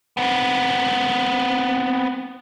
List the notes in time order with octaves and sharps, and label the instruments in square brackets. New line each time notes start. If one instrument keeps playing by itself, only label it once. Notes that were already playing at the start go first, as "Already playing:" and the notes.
[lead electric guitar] B3 C4